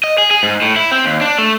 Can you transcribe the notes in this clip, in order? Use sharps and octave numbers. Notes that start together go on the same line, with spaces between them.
D#5
G#4
G#4
G#2
A2
E4
C4
D#2
D4
A3